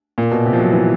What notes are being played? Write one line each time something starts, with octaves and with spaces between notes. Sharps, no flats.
A#2
B2
C3
F3
F#3
E3